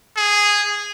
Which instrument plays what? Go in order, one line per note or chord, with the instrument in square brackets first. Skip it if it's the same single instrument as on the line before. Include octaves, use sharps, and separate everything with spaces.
[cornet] G#4